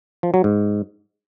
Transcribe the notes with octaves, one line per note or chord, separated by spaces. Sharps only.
F3
F#3
G#2